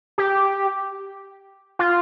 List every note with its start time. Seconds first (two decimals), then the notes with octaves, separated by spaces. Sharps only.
0.18 G4
1.79 F4